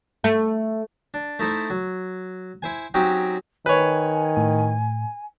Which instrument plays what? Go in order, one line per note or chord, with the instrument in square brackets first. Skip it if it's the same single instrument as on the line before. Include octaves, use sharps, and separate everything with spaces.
[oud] A3
[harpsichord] D4
A3 D#4 E4 C5
F#3
E4 C5 G#5
F#3 C4 C#4 D#4 F#4 G4
[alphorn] D#3 [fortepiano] B4 C#5 [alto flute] G#5
[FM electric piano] A2